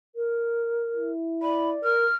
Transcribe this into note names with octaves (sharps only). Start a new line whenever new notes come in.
A#4
E4
D5 B5
A#4 F6